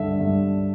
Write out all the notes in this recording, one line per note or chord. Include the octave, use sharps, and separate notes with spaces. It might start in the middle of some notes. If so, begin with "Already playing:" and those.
Already playing: G2 D3 E5
G2